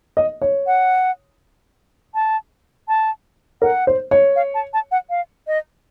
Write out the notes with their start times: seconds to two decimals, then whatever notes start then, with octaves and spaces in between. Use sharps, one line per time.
0.17 D#5
0.42 C#5
0.67 F#5
2.14 A5
2.88 A5
3.62 A#4 F#5
3.87 C5
4.11 C#5
4.36 F5
4.54 A5
4.73 A5
4.91 F#5
5.10 F5
5.47 D#5